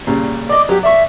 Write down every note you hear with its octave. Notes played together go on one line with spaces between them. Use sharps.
A#2 C#3 G3
D5 D#5 D6
F#3 G4
D5 E5 C#6